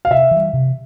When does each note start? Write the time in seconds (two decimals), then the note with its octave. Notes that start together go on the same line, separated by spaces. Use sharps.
0.05 F5
0.11 C3 E5
0.31 E3
0.36 G3
0.53 C3